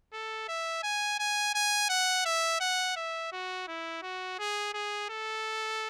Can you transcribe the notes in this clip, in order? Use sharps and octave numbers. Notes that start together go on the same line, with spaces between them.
A4
E5
G#5
G#5
G#5
F#5
E5
F#5
E5
F#4
E4
F#4
G#4
G#4
A4